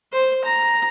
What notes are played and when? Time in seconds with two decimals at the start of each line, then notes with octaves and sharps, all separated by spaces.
0.13 C5
0.45 A#5